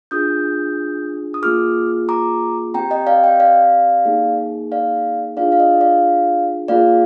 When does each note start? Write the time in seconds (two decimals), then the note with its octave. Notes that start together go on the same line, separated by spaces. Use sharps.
0.11 D4 F4 G#4 D#6 G6
1.34 D#6
1.42 A#3 F4 G#4 D6 F6
2.09 A#5 D6
2.74 C4 G4 G5 A#5
2.91 D#5 G5
3.07 D5 F5
3.24 D#5 G5
3.40 D5 F5
4.05 A#3 D#4 G#4
4.72 D5 F5
5.37 D4 F4 G#4 D5 F5
5.52 F5
5.60 D#5
5.81 D5 F5
6.68 A#3 F4 G#4 D5 F5